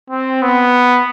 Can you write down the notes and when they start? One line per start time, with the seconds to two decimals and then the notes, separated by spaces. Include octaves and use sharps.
0.10 C4
0.42 B3